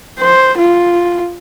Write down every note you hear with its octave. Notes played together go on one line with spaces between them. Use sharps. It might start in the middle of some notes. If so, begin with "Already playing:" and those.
C5
F4